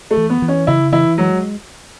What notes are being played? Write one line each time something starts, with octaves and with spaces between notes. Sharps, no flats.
A3
E3
B3
E3
C#4
C#3 E4
E3 E4
F#3 G#3